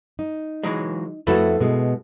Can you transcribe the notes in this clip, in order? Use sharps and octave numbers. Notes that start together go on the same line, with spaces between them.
D#4
E3 F#3 G#3
F2 A3 E4 F#4 A4 B4
B2 G#3